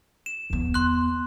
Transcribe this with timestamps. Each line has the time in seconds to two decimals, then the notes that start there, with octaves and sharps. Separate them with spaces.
0.26 E7
0.50 E2 B3
0.74 C6 F#6